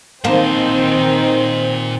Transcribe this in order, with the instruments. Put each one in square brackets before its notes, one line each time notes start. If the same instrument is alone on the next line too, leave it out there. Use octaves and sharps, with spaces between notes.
[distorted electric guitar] A#2 A5 [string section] D#3 C5 G5 [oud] A#3 [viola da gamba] C4 D#4